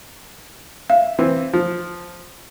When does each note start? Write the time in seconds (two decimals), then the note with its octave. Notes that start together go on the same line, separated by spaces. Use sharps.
0.90 E5 F5
1.19 E3 C4
1.53 F3